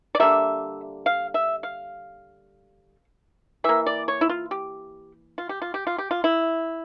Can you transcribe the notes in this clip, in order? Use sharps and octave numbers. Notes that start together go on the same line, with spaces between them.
D5
D3 G3 A#3 E5
F5
E5
F5
E3 A#3 E5
D5
C#5
E4
F4
G4
F4
G4
F4
G4
F4
G4
F4
E4